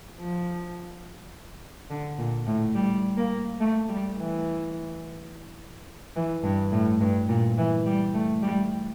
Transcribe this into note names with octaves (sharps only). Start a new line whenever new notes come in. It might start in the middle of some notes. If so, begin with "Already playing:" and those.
F3
D3
A#2
A2
G3
A#3
A3
G3
E3
E3
G2
A2
G2
A#2
E3
G3
A3
G3